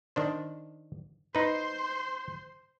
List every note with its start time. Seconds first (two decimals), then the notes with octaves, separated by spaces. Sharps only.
0.16 D#3 D4 C5
1.35 D#4 B4 C5 C6